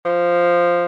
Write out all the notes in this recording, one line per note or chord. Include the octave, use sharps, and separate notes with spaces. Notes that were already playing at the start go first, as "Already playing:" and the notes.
F3